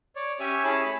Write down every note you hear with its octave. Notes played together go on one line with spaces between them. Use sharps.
C#5 D5
C#4 G4 C#5 E5 G#5
C#4 E4 G#4 C#5 A5 B5
A3 B5